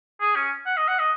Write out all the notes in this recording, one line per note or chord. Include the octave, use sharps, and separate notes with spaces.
G#4
C#4
F#5
D#5
F#5
D#5